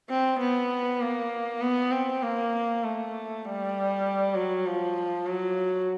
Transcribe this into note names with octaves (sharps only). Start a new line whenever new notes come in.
C4
B3
A#3
B3
C4
A#3
A3
G3
F#3
F3
F#3